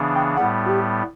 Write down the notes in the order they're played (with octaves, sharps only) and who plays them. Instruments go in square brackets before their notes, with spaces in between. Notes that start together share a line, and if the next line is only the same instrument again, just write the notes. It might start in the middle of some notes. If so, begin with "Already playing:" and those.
Already playing: [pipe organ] C#3 E3 B3 D4
[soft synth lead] G5
[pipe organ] A2 G3 B3 [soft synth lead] F#5
[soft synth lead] F#4
G4